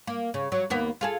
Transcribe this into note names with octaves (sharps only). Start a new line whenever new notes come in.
A#3
C#3
F#3
D#2 A#3 B3
F4 G#4 A4